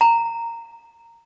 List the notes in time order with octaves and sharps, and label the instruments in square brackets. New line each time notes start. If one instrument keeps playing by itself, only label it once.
[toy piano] A#5